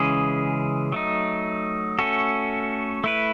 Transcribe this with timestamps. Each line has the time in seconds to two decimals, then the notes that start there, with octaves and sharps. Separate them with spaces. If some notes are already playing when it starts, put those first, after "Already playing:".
Already playing: C#3 E3 G#3 C#4 G#4
0.92 F#3 A3 D#4
1.99 A3 C#4 F#4 A4
3.04 A3 E4 B4